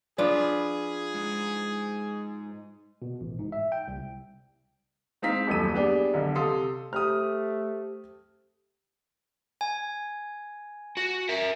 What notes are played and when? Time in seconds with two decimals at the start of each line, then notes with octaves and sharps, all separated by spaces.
0.18 F3 D4 F4 G#4 B4
1.14 G#2
3.02 B2
3.21 A1
3.39 G#2
3.52 E5
3.72 G5
3.88 C2
5.22 G#3 C4 D#4 F5 A#5 B6
5.47 D#1 A1 F#2 A4 D#7
5.75 B3 D4 G4 G#4
6.14 B1 D3
6.35 C3 A4 F5 C6 D#6
6.93 A3 G4 C5 D#6 F6
9.61 G#5
10.97 F#4
11.29 A#4 E5